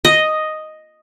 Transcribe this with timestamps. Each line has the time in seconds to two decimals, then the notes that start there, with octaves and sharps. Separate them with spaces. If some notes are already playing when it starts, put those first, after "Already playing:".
0.05 D#5